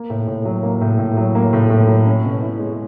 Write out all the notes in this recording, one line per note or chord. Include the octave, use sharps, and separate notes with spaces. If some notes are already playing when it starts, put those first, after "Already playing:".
Already playing: A#3
A2
A2
F#3
A#3
A2
A2
F#3
A#3
A2
A2
F#3
C#4
B2
E4
G#3